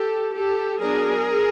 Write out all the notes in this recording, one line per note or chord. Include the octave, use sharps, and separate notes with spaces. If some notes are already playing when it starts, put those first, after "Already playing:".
Already playing: G4 A4
G4 A4
F#3 B3 D4 G#4 A#4